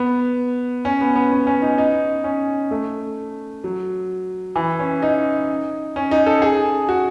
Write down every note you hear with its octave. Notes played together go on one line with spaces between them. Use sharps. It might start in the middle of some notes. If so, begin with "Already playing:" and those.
Already playing: B3
C#4
B3
B3
C#4
C#4
D#4
D#4
C#4
A3
F#3
E3
C#4
D#4
C#4
D#4
A4
G#4
F#4